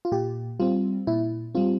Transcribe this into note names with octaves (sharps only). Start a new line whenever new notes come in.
F4
A#2 G4
G3 C4 F4
A#2 E4
G3 C4 F4